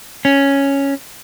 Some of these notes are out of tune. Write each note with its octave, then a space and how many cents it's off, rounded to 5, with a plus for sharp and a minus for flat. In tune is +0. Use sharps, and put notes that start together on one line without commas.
C#4 +0